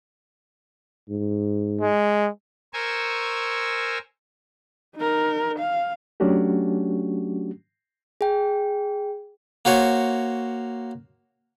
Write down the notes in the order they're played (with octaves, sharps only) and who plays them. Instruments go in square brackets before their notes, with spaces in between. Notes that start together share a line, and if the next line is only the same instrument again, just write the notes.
[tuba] G#2
[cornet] G#3
[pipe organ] A#4 C5 G#5 C#6 E6
[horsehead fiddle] D#4 A#4
F5
[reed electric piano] F#3 A3 C#4 D4 F#4 G4
[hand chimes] G#4 G5
[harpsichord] A#3 F#4 C5 C#5